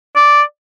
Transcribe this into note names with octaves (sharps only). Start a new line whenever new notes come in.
D5